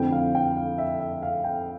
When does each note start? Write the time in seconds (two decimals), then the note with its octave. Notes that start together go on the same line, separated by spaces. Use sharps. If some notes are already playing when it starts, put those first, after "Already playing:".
Already playing: F2 D3 A3 C4 E4 G5
0.12 F5
0.35 G5
0.57 F5
0.78 E5
1.00 E5
1.23 F5
1.44 G5